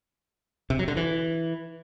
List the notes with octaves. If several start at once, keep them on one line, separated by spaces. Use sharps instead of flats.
C3
F#3
D3
E3